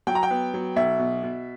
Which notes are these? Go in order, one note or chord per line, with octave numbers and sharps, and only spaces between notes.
F#3 G5
A#5
G5
B3
F#3
B1 E5
B2
B2